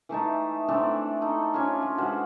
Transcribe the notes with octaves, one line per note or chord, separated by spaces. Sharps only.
E3 A3 D#4 A5
E3 A3 C4 D4
D#4 A4
C#4 D4 F4 C#5
F4
E3 G#3 F#4 C5